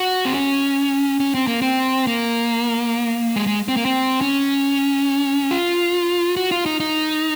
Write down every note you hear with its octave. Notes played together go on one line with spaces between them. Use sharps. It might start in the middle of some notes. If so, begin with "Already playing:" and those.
Already playing: F#4
C4
C#4
C#4
C4
A#3
C4
A#3
G#3
G#3
C4
A#3
C4
C#4
F4
F#4
F4
D#4
D#4